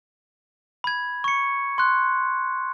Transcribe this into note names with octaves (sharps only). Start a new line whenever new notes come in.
B5 G#6
C#6 C#7
C6 F#6